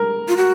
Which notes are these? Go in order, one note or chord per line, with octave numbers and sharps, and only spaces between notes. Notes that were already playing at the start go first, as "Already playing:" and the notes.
Already playing: A#4
F4
F#4